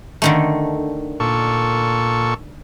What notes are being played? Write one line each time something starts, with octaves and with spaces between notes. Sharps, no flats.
D3 D#3 A3
A#2 A4 C#6